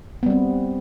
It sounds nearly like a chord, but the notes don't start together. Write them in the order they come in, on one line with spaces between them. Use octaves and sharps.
B3 G3 C4